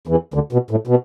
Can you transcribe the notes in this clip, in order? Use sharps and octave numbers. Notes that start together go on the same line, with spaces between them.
E2 E3
D2 D3
B2
A2
B2